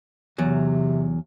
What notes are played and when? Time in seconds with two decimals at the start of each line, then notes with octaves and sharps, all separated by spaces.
0.38 E2 C3 F#3